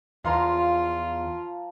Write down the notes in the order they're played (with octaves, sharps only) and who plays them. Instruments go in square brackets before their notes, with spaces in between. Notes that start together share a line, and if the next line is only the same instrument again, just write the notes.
[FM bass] E2 [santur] F3 A#5 [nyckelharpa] F4 [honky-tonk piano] F5 C6